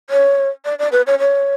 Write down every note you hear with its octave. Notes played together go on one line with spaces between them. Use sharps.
C#5
D5
D5
B4
C#5
C#5